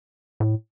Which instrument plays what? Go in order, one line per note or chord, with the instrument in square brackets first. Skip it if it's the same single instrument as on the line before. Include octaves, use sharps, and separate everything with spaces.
[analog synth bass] A2